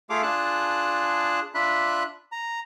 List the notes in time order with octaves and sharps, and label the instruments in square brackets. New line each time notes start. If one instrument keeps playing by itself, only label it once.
[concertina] A3 F4 G#4 A4 F5 D6
D4 F4 G#4 A5 F#6
D4 F4 E5 B5 F#6
A#5